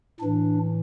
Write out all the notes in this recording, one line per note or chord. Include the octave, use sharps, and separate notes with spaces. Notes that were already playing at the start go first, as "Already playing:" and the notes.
A2 E3 D4